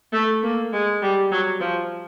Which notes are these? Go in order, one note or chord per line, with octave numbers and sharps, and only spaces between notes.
A3
A#3
G#3
G3
F#3
F3